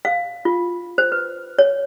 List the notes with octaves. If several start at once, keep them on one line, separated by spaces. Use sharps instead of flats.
F5
F4
C5
B4
C#5